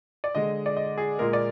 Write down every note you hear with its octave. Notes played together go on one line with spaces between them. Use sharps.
D5
D3 G#3 D#5
D5
D#5
G#4
A#2 G#3 A#4
D5